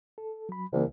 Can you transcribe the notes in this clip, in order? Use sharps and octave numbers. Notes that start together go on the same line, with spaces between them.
A4
F#3 B5
C2 C#3 E3 A#3